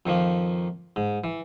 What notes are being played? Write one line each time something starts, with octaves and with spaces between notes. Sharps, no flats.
F2 D#3 F3 A#3
G#2
E3